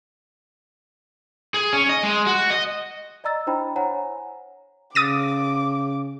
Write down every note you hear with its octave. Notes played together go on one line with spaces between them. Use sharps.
G#4
C#4
D#5
G#3
F#4
D#5
D5 D#5 A#5 E6 A6
D4 E4 C5 G5 A#5 B5
C5 C#5 F#5 G#5 A#5
C#3 D6 D#6 A6 D#7